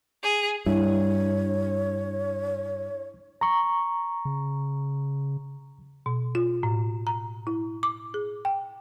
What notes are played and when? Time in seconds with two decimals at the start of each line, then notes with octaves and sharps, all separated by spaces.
0.23 G#4
0.66 G2 E4 C#5
3.41 A#5 C#6
4.25 C#3
6.06 B2
6.35 F4
6.63 A2
7.07 A#5
7.47 E4
7.83 D6
8.14 G#4
8.45 G5